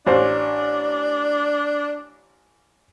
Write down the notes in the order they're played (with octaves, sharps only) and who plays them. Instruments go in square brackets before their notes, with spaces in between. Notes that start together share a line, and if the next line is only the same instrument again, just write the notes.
[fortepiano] A1 C5 [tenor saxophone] D4